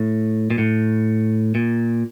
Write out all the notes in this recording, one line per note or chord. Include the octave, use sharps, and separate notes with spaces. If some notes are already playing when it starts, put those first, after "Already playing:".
Already playing: A2
A#2
A2
A#2